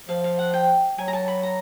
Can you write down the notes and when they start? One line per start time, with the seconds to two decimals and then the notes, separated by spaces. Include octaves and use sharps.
0.09 F3 F5
0.24 F5
0.39 F#5
0.54 G5
0.98 F#3 G#5
1.08 A#5
1.13 A5
1.28 B5
1.43 A#5